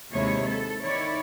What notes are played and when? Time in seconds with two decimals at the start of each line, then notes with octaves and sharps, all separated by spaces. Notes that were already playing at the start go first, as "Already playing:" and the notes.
0.13 D#2 C3 G#3 E4 C#5
0.47 A4
0.82 D#3 E4 C#5 D5